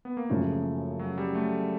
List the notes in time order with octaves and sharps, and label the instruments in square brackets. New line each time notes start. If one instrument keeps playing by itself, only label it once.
[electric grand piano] B3
A#3
[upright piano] F#2 C#3 F3 [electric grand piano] A3
[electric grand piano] F#3
G3
A3